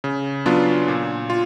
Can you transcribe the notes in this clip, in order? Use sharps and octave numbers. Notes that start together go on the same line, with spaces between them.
C#3
F#3 B3 D4 F4
A#2
F4